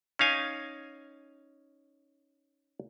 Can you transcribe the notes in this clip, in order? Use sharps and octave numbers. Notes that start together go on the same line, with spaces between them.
C#4 D#4 F5 G#5